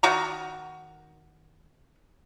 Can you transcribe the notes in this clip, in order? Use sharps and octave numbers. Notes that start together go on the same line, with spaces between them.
D#3 F#4 A#5